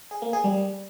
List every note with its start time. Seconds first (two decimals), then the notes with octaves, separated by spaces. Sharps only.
0.11 G#4
0.22 A#3
0.33 G#4
0.44 G3